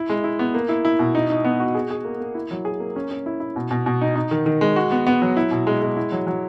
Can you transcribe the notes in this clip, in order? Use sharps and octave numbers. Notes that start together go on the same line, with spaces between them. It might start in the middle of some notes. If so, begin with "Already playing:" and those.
Already playing: E4
G#3
E4
B3
A#3
E4
E4
B2
D#4
D#4
B3
F#4
G#4
G#4
A#3
A#3
E4
F#3
G#4
A#3
C#4
C#4
E4
E4
B2
B2
B2
D#4
D#4
D#3
D#3
G#3
F#4
B3
B3
F#3
E4
B2
G#3
G#3
E4
F#3
F#3